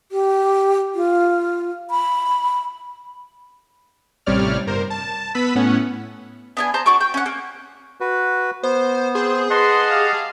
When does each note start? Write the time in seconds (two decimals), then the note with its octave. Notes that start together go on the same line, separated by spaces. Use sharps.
0.12 G4
0.95 F4
1.91 B5
4.26 A1 C3 G3 C#5 D5 F6
4.66 G1 A#4 C5
4.90 A5
5.35 B3 B4 B5 E6 B6
5.55 A2 B3 C#4 F#5
6.57 B3 D4 G#5
6.74 C5 A5 A#5
6.86 D4 F#4 C#6 D6
7.01 G5
7.14 C#4 F#5
7.26 A#3
8.01 F#4 B4
8.63 B3 C5
9.15 C4 G#4 C5
9.50 B4 D#5 F#5 A5 C6
9.91 G4 F5